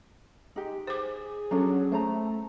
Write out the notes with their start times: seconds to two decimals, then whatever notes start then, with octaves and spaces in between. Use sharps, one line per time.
0.56 G#3 D#4 G4
0.87 G#4 C5 D6
1.51 F#3 C#4 D4 F4 A4
1.92 A3 C5 A5 A#5